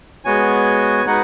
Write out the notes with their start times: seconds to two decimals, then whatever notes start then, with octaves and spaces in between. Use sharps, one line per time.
0.25 G#3 B3 F#4 C#5 G#5
1.05 G#3 D#4 F#4 B4 F#5